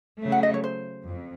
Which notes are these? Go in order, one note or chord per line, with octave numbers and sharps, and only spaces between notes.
C#3 F#3 A3
F#5
D#5
C#5
C5
F2